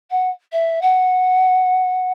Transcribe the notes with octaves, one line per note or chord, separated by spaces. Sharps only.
F#5
E5
F#5